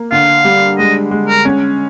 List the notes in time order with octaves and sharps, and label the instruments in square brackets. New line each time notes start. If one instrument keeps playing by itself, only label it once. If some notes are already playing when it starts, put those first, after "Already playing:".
Already playing: [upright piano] A#3
[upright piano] D3 [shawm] F5
[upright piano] G3
[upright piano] G#3 [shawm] D#5
[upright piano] G#3
[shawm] A#4
[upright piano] C#4